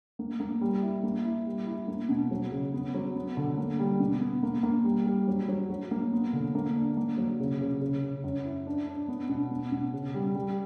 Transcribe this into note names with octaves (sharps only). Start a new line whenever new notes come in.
A#3
A#3
G3
E4
A#3
E4
G3
E4
A#3
B2
F#3
C#3
B3
F#3
B3
D3
A#3
G3
B2
B3
A#3
A#3
G3
G3
F#3
F#3
F#3
A#3
B3
D3
A#3
D4
A#3
F#3
C#3
C#3
C#3
C#3
F#2
E4
D4
D4
B3
B2
B3
B2
C#3
G3
G3